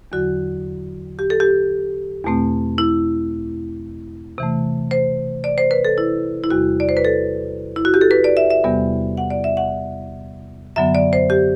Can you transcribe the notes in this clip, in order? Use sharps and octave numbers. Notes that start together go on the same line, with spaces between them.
E2 D3 F#3 F#4
G4
A4
G4
E2 B2 A3 C4
E4
C3 E3 A3
C5
D5
C5
B4
A4
E4
E4
E2 C3 G3 F#4
D5
C5
B4
A4
E4
F#4
G4
A4
B4
D5
E5
E5
E2 C3 G3 B3
F#5
D5
E5
F#5
F#2 D3 F#3 B3 E5
D5
C5
G4